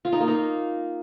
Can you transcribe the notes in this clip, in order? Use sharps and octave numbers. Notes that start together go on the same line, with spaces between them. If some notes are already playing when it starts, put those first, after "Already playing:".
F4
D#4
A#3
D#4